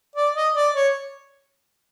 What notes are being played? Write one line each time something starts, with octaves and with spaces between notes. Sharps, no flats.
D5
D#5
D5
C#5